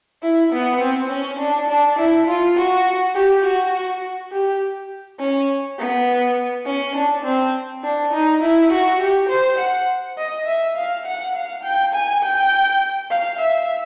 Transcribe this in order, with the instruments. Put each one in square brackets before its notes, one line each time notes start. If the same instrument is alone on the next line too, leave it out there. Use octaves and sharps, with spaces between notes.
[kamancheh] E4
B3
C4
C#4
D4
D4
E4
F4
F#4
G4
F#4
G4
C#4
B3
C#4
D4
C4
D4
D#4
E4
F#4
G4
C5
F#5
D#5
E5
F5
F#5
F5
G5
G#5
G5
F5
E5